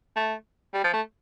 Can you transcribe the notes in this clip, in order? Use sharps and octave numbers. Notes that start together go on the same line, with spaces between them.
A3
G3
F3
A3